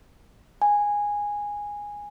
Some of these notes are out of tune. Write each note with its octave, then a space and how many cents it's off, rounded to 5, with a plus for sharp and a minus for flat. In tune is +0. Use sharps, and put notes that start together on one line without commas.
G#5 -10